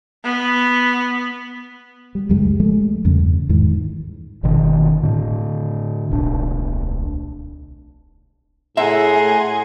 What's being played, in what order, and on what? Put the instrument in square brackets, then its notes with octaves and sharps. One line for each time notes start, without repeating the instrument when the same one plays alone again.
[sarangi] B3
[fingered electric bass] G3
C#2 F#2 G3 G#3
F3 G#3 A3
E2 G2 C#3
E2 G#2 D#3 E3
G1 B2 D3 D#3
A2 D3
D1 B1 D4
[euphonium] A2 [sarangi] G#4 [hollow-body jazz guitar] E5 [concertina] F#5 A#5 C6